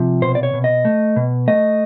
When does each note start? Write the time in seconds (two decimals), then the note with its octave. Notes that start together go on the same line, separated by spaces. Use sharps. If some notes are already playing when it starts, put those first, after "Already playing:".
Already playing: C3 F3
0.22 B2 C5
0.35 D5
0.43 C#5
0.54 B2
0.64 D#5
0.85 A3
1.16 B2
1.48 A3 D#5